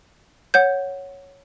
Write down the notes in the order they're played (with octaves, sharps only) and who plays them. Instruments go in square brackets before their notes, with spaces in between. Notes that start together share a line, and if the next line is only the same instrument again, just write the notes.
[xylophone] C#5 F#5 G6